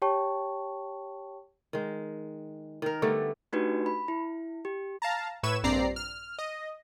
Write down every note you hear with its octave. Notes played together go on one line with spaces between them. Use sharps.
G4 C#5 G5 A5 C#6
D#3 G#3
D#3 A#4
D3 G3 A3 B3
A3 D4 D#4 F#4 G4 B4
B5
E4
G4
F5 A5 A#5
A2 B4 C#6 E6 G#6 E7
A#1 G2 C4 D5 A#5 C7
F6
D#5